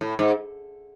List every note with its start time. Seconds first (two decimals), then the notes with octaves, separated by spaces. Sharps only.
0.01 A2
0.19 G#2